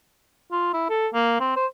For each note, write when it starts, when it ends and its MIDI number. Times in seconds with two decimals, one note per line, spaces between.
0.52 0.71 65
0.74 0.87 64
0.90 1.08 69
1.14 1.36 58
1.40 1.54 60
1.56 1.66 72